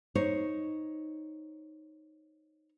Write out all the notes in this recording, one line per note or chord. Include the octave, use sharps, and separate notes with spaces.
D#4 C5 C#5